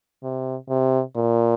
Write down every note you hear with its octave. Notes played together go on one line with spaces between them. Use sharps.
C3
C3
A#2